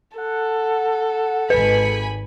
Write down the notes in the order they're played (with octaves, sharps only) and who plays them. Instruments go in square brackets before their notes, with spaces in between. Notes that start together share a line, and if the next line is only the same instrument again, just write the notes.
[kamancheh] A4 [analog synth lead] F#5
[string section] G#1 G#5 B5 [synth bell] B4 [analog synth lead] C#7